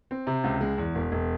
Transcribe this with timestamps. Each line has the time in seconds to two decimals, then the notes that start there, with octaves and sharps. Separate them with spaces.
0.11 C4
0.27 C3
0.44 C#2
0.61 G#3
0.78 E2
0.95 E1
1.12 E1